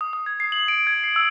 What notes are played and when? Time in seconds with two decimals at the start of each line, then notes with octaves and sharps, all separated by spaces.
0.01 D#6
0.13 D#6
0.26 G#6
0.40 C7
0.52 F#7
0.68 D7
0.87 G#6
1.04 C7
1.16 E6